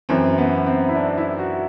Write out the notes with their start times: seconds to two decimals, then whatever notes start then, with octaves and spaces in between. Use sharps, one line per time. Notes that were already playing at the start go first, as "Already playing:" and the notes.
0.09 F#2 E3 C4
0.38 B3
0.67 C4
0.89 E4
0.95 D4
1.18 E4
1.39 F#4